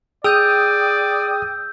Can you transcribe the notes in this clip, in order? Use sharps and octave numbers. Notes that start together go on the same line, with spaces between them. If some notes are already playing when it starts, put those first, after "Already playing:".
G#4 D5 G5 D#6 E6 G6